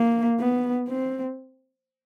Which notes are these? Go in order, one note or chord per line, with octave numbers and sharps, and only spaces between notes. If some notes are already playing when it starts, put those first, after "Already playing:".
Already playing: A#3
B3
C4